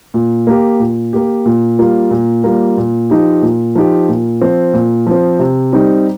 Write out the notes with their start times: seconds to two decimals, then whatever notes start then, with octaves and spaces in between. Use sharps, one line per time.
0.14 A#2
0.47 A#3 G4
0.80 A#2
1.13 A#3 G4
1.46 A#2
1.79 G3 A#3 F4
2.11 A#2
2.44 G3 A#3 F4
2.77 A#2
3.10 F3 D#4 G4
3.42 A#2
3.75 F3 D#4 G4
4.09 A#2
4.41 F3 C4
4.73 A#2
5.07 F3 C4
5.39 C3
5.72 G3 C4 D#4 G4